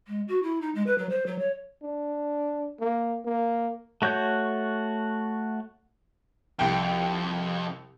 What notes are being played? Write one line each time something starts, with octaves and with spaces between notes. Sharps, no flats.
G#3
F#4
E4
D#4
G#3
B4
F#3
C5
F#3
C#5
D4
A#3
A#3
A3 F#4 C#5 G6
C2 F2 G5